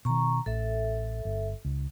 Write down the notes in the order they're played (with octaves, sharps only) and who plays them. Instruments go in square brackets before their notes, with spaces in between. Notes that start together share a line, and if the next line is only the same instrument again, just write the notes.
[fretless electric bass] B2 D#3 [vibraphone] A#5 C#6
[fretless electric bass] A1 [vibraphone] A4 E5
[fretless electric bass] G1
C#2